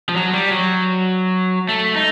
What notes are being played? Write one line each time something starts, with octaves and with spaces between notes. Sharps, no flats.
F3
F#3
G3
F#3
A3
D#4